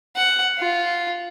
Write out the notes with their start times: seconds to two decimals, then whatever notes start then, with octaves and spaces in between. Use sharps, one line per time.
0.16 F#5
0.59 F4